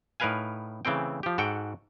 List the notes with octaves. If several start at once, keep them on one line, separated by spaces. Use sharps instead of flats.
A2 D#4 A#4 B4 F5 G#5
C#3 E3 A3 C4 G5
F3 G4
G#2 F#4 A4 F#5 G5